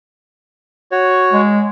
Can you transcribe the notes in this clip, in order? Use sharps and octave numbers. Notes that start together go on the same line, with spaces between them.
F#4 C#5
G#3